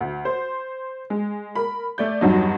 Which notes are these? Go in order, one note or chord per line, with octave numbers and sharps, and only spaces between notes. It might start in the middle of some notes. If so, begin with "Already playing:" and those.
D2
C5
G#3
A#4 B5
A3 D5 G6
E2 G2 F#3 D#4